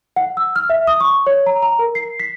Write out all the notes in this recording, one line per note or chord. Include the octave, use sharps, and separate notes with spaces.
F#5
E6
F6
E5
D#6
C#6
C#5
A#5
A#5
A#4
C7
B6